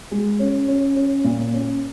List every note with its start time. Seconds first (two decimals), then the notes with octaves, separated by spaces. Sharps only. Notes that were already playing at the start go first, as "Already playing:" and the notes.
0.11 G#3
0.39 C#4
0.68 C#4
0.96 C#4
1.24 A#2
1.53 C#4